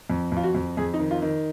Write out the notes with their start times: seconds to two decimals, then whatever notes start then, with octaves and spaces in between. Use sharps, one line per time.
0.10 F2
0.32 F2 F4
0.43 F#4
0.55 F2
0.77 F2 G#4
0.94 D#4
0.99 D#3
1.11 F4
1.22 D#3